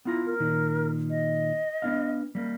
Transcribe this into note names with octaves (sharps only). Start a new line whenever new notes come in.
B3 E4 F4 A#5
A#4
A#2 D#3
D#5
B3 D4 F5
G3 A#3